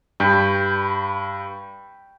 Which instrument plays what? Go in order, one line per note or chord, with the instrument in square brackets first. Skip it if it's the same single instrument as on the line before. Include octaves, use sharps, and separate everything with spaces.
[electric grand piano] G2 [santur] G5 B5